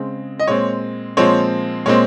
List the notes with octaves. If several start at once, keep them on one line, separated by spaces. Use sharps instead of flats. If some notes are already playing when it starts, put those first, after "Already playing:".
Already playing: C#3 G#3 C4
D#5
A#2 G#3 C4 C#5
A#2 F3 G#3 C4 C#5
A#2 G#3 C4 C#5